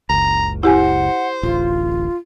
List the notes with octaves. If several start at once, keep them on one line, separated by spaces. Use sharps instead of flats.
F#1 C#2 A#5
E4 G4 C5 F#5 G#5
D1 A1 F4